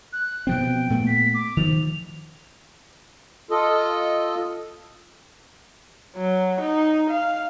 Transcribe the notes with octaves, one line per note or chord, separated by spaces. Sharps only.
F#6
B2 F3 C4 G5
A#2 A3 B3
B6
D6
D#3 F3 F7
F4 A4 D#5
F#3
D#4
F5